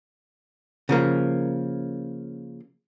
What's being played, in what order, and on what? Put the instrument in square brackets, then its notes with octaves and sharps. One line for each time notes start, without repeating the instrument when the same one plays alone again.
[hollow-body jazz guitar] C#3 F3 A#3